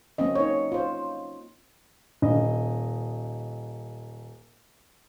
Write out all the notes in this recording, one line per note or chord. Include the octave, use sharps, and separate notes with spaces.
F#3 A#3 C4 C#4 D#5
D#4 C#5
F4 C5
D#1 D#5